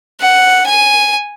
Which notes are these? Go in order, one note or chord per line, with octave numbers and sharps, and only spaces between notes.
F#5
G#5